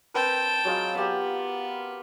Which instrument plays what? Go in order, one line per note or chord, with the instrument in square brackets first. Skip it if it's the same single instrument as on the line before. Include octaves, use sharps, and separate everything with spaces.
[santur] C4 A#4 B4 [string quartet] G5 A5
[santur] F#3 G#3 F4
[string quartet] B3 [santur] G4 F5